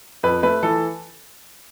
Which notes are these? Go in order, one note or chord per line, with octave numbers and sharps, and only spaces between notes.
F2 B4
A3 B4
E3 A4